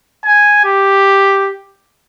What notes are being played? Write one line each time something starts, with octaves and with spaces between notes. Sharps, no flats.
G#5
G4